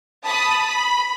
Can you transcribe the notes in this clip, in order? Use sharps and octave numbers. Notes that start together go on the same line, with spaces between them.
A5 B5 D#6
B5